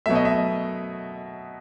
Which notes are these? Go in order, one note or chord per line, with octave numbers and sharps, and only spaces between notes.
B2 F#3 A3 E5
D#5
E5